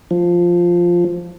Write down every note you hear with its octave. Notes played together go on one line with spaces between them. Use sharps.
F3